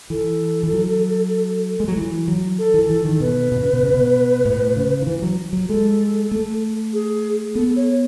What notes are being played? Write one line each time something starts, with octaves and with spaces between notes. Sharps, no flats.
E3 A4
E3
F#3
G#3
F#3
E3
F#3
A4
E3
E3 A4
D#3
B2 B4
B2
C#3
B2
C#3
B2
A2
C#3
D#3
E3
F#3
F#3
G#3 A4
A3
G#4
B3 A4
C#5